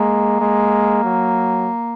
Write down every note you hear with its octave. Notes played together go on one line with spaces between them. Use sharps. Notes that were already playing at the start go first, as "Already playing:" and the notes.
Already playing: G#3 A#3
G#3
F#3